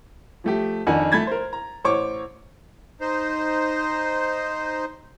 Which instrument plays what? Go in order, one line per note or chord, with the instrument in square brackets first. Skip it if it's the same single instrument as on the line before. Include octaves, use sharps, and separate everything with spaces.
[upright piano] F3 A3 G4
F2 D#3 D4 A#4 F#5 G#5
F3 A3 B5 G#6 A6
A#4 C5
A#5
A1 C5 C#5 C#6 D6
[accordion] D#4 C5